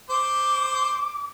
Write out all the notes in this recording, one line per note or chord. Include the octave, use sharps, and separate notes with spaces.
C5 D6